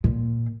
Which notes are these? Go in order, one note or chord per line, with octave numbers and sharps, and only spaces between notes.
A#2